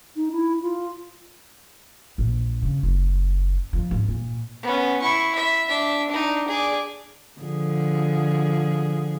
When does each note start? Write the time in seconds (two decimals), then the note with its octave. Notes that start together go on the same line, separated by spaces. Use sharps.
0.16 D#4
0.32 E4
0.62 F4
2.18 A#1
2.62 C#3
2.83 F#1
3.73 F3
3.91 G#1
4.08 A#2
4.62 B3 C#4
5.02 E4 C#6
5.35 E5
5.68 D4 E5
6.09 D4 D#4
6.48 G#4 D5
7.41 D3 F3 G#4